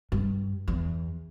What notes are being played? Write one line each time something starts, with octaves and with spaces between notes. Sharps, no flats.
G2
E2